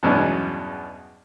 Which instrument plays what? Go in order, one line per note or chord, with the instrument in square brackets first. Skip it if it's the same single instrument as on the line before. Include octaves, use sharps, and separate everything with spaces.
[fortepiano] E2 G2 B2 F#3 G#3 C#4